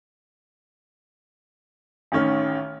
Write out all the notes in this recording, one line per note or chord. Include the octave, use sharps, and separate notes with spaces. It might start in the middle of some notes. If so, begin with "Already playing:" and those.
A1 D#3 C#4 F6